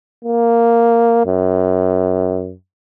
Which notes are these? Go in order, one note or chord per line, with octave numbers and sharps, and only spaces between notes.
A#3
F#2